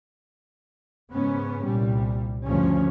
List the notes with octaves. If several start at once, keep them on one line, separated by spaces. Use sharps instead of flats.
G#2 C#3 B3 C#4
C2 A#2 G3
D2 G2 C#3 F3 C#4